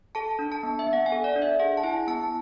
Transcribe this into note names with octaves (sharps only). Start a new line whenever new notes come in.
A4 A5
D4
A5
B3
E5
B3
F#5
G#5
A4
D5
D4
E5
G#4 F#5
A5
E4 G#5
B3 A5